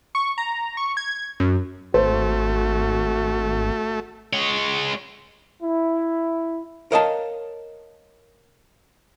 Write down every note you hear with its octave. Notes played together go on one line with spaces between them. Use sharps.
C#6
A#5
C#6
G#6
F#2
G#1 A3 F#4 C5
G#3 C#5
E4
A#4 C#5 D#5 F5 G5 A5